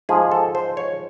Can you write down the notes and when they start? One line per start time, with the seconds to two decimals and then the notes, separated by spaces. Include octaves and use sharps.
0.09 G#2 F3 G#4
0.31 A4
0.55 C5
0.77 C#5